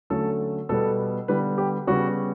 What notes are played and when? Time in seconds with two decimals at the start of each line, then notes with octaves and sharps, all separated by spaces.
0.10 D3 F#3 A3 C#4 A4
0.69 B2 G3 B3 A4
1.28 D3 G3 B3 B4
1.58 G4
1.87 C#3 G3 B3 F#4